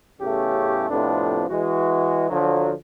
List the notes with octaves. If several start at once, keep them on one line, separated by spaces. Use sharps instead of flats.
A1 E2 C#3 A3 C#4 G4
F2 A2 C3 F3 B3 D4
E3 G#3 F#4
D3 F3 F#3